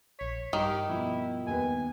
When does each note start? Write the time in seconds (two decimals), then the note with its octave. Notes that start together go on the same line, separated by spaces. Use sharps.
0.19 A#1 C#5 B6
0.53 G2 D#3 G3 G4
0.88 B2 F3 E4
1.47 D#2 B3 B4 G#5